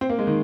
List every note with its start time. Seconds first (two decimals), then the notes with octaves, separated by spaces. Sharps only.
0.01 C4
0.09 A#3
0.19 G#3
0.27 D#3